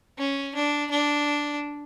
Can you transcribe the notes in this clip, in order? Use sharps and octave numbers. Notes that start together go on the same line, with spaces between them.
C#4
D4
D4